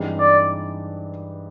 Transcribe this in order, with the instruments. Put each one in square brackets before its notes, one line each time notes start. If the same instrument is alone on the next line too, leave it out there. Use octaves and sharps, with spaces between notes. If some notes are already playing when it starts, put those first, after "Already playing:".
Already playing: [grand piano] G2 E3 G#3 C4 D#4
[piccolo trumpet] D5